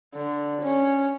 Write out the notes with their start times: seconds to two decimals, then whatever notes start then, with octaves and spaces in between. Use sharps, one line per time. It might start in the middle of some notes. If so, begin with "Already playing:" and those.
0.14 D3
0.62 C#4